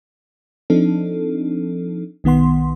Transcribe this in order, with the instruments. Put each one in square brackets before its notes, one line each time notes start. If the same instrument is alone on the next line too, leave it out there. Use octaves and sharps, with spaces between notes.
[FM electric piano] F3 C4 D4 D#4 A4
B1 D#3 B3 F#5 C6